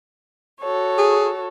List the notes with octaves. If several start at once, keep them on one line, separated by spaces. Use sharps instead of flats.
F#4 A4 C#5
G#4